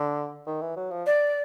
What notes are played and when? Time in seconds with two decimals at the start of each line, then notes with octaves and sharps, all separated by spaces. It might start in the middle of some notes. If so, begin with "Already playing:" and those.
Already playing: D3
0.46 D#3
0.61 E3
0.76 F#3
0.91 F3
1.06 D5